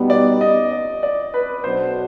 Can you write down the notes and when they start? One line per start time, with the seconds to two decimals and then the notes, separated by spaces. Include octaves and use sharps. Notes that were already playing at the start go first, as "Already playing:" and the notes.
Already playing: B2 G3 B3 D#4
0.10 D5
0.41 D#5
0.72 D5
1.03 D5
1.34 B4
1.64 B1 B2 F#3 B3 D4 C5